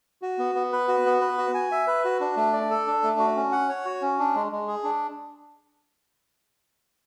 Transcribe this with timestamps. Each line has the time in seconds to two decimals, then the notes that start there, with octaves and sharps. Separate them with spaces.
0.22 F#4
0.38 B3
0.55 B3
0.73 B4
0.88 F#4
1.06 B3
1.21 B4
1.38 F#4
1.54 G#5
1.72 E5
1.87 B4
2.05 F#4
2.21 D4
2.37 A3
2.53 D5
2.70 A4
2.87 D4
3.04 A3
3.20 F#4
3.37 C#4
3.52 F#5
3.69 C#5
3.85 F#4
4.02 C#4
4.19 D4
4.35 G#3
4.52 G#3
4.68 G#4
4.84 D4